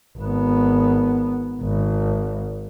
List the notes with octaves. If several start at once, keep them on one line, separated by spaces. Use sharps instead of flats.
G#1 B3
G#1